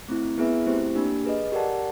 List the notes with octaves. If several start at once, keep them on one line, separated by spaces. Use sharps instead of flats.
A3 C4 E4
B3 E4 G#4 B4 E5
A3 C4 E4 G4 C5
A#3 D4 G4
G#4 B4 D#5
G4 A#4 D5 F#5 A5